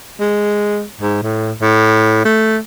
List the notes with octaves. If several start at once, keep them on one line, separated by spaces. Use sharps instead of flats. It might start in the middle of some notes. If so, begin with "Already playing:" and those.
G#3
G#2
A2
A2
A3